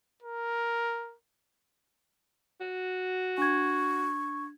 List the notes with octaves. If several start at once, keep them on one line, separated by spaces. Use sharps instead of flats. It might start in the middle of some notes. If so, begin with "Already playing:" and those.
A#4
F#4
D4 C#6 G#6